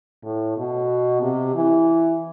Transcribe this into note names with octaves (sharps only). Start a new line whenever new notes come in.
A2
B2
C3
E3